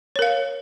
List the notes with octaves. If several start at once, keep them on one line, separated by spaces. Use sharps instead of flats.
A#4 C#5 F5